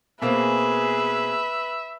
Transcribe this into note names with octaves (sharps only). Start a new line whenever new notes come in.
B2 A#3 C4 G#4 B4 E5